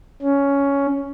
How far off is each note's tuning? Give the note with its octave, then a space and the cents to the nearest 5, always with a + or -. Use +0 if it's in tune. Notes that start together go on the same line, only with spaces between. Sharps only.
C#4 +10